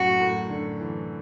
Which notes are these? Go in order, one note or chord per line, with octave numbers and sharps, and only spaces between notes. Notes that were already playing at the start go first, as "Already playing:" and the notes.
Already playing: F#2 A2 F#4
A2
D3
E3